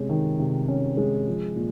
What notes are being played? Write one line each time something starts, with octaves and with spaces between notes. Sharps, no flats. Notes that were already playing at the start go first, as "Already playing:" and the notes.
Already playing: C3 G#3 C#4
D#3
C3
C#4
G#3
F3
A#2